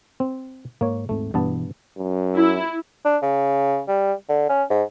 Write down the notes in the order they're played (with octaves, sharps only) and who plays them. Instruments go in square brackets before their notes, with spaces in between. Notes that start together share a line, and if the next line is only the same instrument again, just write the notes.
[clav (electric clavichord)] C4
[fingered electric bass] G#2 [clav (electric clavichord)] A#3 C#5
[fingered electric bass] D#1 G#2 C4 [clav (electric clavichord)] A3
[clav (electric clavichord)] G2 B3 A5 [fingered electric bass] B2 E3 G3
[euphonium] F#2
[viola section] E4
[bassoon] D4
C#3
G3
D3
C#4
G#2